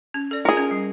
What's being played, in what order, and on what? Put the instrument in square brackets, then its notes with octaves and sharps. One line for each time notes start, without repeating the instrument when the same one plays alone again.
[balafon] C#4
A4 D5
[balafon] F4 [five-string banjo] G#4 A#4
[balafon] C#4
G3